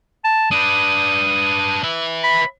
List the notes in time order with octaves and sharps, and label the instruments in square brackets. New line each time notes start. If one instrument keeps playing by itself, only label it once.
[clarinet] A5
[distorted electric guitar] D4 B4 [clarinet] D#6
[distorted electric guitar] B4 E5
[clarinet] B5